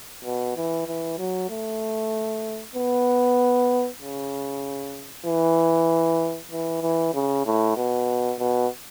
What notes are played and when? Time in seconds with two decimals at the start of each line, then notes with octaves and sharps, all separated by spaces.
0.24 B2
0.56 E3
0.87 E3
1.18 F#3
1.49 A3
2.75 B3
4.01 C#3
5.26 E3
6.51 E3
6.82 E3
7.14 C#3
7.46 A2
7.77 B2
8.39 B2